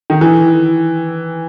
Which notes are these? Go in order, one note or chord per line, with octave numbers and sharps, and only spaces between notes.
D#3
E3